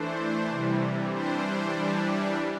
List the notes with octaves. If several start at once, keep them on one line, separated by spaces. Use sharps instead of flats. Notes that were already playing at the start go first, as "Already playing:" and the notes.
Already playing: E3 A3 D4 C5
C3 E3 G3
E3 G3 D4 C5
E3 G3 D4